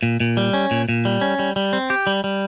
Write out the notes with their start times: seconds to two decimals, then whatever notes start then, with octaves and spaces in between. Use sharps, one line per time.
0.03 A#2
0.20 A#2
0.37 G3
0.53 C#4
0.71 A#2
0.89 A#2
1.05 G3
1.21 C#4
1.39 G3
1.56 G3
1.73 C4
1.90 G4
2.07 G3
2.24 G3